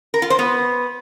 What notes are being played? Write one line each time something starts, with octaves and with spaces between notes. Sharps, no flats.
A#4
F4
C5
B3